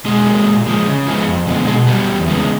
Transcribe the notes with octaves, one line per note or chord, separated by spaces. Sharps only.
B2 G#3 G#4
F#3 A#3
A#2
F3 G#3
C#3
F3 G#3 B3
F2
D3 F3 G#3 B3
B2 G#3 G#4
F#3 G3 B3 G4
E2
C#3 E3 G#3 B3